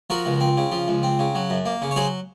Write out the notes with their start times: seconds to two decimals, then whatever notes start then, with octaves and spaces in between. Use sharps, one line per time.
0.10 F3 F#4 A#4
0.26 C#2
0.41 C4
0.57 C#3
0.72 F3
0.88 C#2
1.03 C4
1.19 C#3
1.35 F#3
1.50 F#2
1.66 A#3
1.82 C#3
1.91 C#5
1.96 F#3 G#4 C5